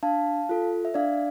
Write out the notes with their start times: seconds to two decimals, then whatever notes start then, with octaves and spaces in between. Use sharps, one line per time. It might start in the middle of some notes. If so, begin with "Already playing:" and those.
0.03 D4 F5 A5
0.49 F4 A4
0.85 E5
0.94 D4 D5 F5